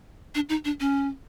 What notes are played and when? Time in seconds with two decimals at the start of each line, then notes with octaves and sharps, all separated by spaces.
0.35 D4
0.49 D#4
0.65 D4
0.80 C#4